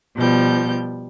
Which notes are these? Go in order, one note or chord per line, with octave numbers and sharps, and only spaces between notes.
B2 F3 G3 G6